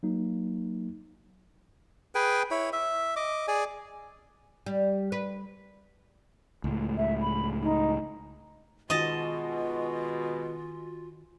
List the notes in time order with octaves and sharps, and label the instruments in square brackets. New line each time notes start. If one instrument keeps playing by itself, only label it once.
[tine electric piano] F#3 A#3 D#4
[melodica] G#4 B4 G5 G#5
E4 C#5 B5
E5
D#5 D6
G#4 D5 G#5
[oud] G3
B4
[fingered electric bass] C#2 A2
[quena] E5
B5
D#4
[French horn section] B2 G#3 [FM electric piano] D#3 F#4 G#5 [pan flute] F4 [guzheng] D#5 A5